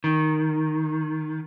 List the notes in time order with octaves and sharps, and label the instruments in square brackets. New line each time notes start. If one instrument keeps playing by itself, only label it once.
[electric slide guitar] D#3